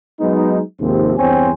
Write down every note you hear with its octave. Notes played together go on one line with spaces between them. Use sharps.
F#3 G#3 B3 D#4
D#2 G#2 C3 F3 C4
E2 G2 C4 C5 C#5 G#5